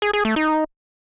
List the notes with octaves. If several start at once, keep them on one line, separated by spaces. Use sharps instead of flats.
G#4
G#4
A3
D#4